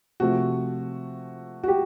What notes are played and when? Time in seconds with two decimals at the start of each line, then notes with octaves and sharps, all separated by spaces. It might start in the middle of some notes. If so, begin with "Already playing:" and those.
0.20 C3 F3 A3 F#4
1.63 F#4
1.68 G4